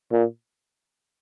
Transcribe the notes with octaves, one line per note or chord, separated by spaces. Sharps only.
A#2